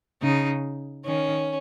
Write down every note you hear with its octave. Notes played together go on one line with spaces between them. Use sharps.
C#3 D#4
D#3 C#4